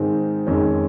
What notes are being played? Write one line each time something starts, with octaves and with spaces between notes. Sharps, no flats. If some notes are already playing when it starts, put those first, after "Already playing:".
Already playing: G#2 D#3 G#3 C4
F2 D#3 G#3 C#4